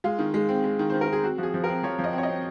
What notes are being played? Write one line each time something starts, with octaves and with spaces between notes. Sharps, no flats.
G#3 F4
D#3
G#3
C4
G#3
D#3
D#3 C5
A#4
D#3 G#4
C4 F#4
F3 F#4 G#4
F3
C4 A#4
F3 C#5
F3
D#5
C4
C#5
D#5
C4